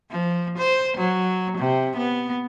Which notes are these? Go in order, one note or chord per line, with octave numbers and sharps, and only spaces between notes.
F3
C5
F#3
C3
B3